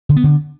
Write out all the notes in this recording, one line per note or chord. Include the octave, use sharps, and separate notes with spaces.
D3
B3
D3